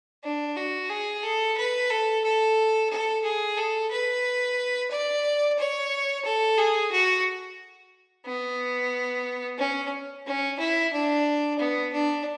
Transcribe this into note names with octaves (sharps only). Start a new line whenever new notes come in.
D4
F#4
G#4
A4
B4
A4
A4
A4
G#4
A4
B4
D5
C#5
A4
G#4
F#4
B3
C#4
C#4
E4
D4
B3
D4